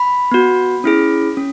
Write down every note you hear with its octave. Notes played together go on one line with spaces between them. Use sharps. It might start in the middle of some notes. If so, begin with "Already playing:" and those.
Already playing: B5
B3 F#4
C#4 E4 G#4
C#4